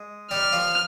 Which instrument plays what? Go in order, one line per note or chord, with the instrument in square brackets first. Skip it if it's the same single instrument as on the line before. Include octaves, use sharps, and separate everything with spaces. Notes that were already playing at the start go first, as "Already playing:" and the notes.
Already playing: [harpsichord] G#3
[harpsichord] G3 G4 [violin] F6
[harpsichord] F3 F4